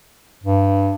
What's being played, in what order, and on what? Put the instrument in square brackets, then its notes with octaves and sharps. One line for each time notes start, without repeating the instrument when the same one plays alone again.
[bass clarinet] G2